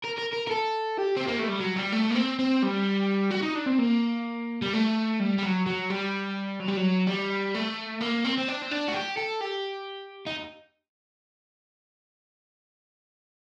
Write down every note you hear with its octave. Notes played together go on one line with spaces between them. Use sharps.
A#4
A#4
A#4
A#4
A4
G4
C4
A#3
A3
G3
F#3
G3
A3
A#3
C4
C4
G3
F#4
D#4
D4
C4
A#3
G3
A3
G3
G3
F#3
F#3
G3
F#3
G3
F#3
G3
A3
A#3
C4
C4
D4
C4
D4
F#4
G4
A4
G4
D#4